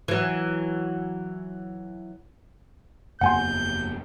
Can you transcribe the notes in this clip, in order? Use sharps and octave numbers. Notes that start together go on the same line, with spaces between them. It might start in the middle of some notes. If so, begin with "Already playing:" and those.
E3 F#3
F#1 E2 A#3 F#5 G#5 C6 G6